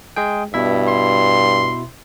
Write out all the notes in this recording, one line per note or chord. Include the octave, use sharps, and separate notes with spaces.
G#3 G#4 G5
G2 B2 E4 E5
C6